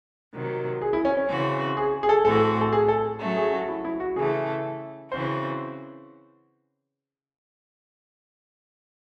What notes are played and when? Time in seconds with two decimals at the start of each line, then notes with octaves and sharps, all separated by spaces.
0.34 C3 D#3 F#3
0.81 G#4
0.93 E4
1.05 C#4
1.17 C#4
1.29 C#3 E3 C4 F#4
1.77 G#4
2.03 G#4
2.09 A4
2.24 A2 E3 C4 F#4 A4
2.61 A4
2.73 G#4
2.88 A4
3.21 F#3 A3 C#4
3.36 G#4
3.53 F#4
3.68 E4
3.85 E4
4.00 F#4
4.16 C#3 E3 A3 G#4
5.11 C#3 E3 C4 F#4 C5